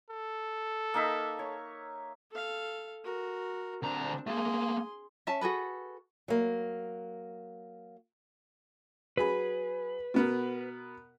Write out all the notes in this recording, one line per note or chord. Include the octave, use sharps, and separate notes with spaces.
A4
A#3 D#4 E5
C#5
A4 F5
F#4 A#4
D2 C4 D4 A#5
A3 A#3 G#4 C6
C#4 E5 A5
F#4 G#4 A4 B4
F#3 A#3
F#3 G#4 B4 B5
B2 B3 A#4